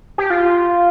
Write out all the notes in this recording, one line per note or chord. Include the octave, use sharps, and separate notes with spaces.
G4
F4